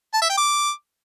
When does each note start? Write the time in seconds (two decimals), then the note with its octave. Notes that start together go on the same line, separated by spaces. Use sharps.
0.14 A5
0.22 E5
0.30 G5
0.37 D6